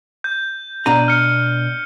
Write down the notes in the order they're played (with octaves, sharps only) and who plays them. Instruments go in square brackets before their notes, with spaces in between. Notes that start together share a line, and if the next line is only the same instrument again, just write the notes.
[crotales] G6
[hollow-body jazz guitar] B2 D4 A#5 [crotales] D#7
[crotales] F6 C#7